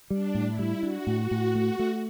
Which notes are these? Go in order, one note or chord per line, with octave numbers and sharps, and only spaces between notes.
G3 D4
A2
E4
G3
D4 F#4
A2
F#4
A2
A3 F#4
A3